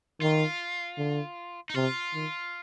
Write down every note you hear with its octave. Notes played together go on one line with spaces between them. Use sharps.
D#3 F4
D3
D#4
C3 F4
D#3